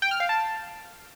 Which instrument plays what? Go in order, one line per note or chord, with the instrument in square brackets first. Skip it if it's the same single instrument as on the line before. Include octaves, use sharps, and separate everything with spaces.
[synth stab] G5
F6
F5
A5